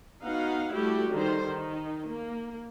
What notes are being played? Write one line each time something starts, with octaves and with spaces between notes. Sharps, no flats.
B3 D#4 F#4 F5 F#5
G3 A3 E4 F#4 G4 A4
D3 D#3 G3 C5
D#3 D#4
A#3